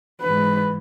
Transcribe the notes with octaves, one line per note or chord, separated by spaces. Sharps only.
G#2 E3 B4